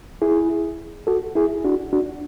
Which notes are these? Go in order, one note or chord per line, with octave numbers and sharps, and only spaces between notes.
E4 G#4
F#4 A4
E4 G#4
D4 F#4
D4 F#4